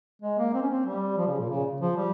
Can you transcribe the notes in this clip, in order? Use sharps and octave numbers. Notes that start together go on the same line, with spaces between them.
G#3
A#3
C4
C#4
C4
G3
F3
C#3
A#2
C#3
F3
G3